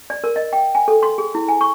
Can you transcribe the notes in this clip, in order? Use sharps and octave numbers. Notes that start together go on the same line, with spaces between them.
D5
A#4
D#5
G5
G#5
A4
C6
G#4
E4
G#5
C#6